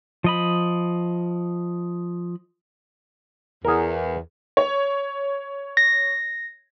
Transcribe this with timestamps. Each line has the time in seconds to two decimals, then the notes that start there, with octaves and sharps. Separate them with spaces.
0.24 F3 D#5 B5
3.65 E2 G#4 A#4
4.57 C#5
5.77 A#6